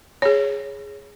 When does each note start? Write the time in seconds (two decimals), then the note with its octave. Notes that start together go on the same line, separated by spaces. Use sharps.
0.22 G#4 C#5